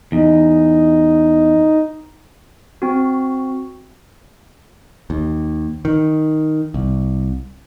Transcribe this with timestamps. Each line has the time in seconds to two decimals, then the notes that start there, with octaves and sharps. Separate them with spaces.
0.12 E2 D#4
2.82 C4 F#4
5.10 D#2
5.85 D#3
6.74 C2